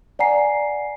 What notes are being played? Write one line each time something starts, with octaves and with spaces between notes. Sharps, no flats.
D5 F#5 G#5 A#5 C7